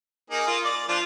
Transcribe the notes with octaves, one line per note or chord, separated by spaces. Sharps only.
A#3 D#4 G#4
A#3 F4
D5
F3 D4 F4